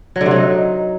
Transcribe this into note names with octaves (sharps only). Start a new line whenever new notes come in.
F#3
D3
C3
F#3
D#4